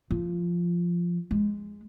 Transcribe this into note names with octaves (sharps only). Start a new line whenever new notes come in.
F3
G#3